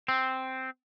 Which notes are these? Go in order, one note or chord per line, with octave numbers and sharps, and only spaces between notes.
C4